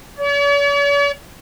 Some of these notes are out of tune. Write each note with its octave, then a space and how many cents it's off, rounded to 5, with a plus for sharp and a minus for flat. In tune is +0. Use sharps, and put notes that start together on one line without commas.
C#5 +45